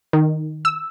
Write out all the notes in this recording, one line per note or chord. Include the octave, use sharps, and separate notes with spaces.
D#3
E6